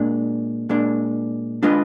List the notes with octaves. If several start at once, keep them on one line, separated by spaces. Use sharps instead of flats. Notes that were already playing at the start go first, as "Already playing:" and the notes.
Already playing: A#2 G#3 D4
A#2 G#3 D4
G#3 D4 F4 B4 D#5